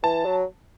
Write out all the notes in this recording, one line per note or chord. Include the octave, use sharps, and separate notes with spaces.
E3 A5
F#3